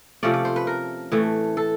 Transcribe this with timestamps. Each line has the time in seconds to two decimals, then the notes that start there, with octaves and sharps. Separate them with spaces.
0.23 C3 F3 A3 C#4 D5
0.34 D5
0.45 C5
0.56 B4
0.67 A#4
1.12 A2 E3 A3
1.57 A4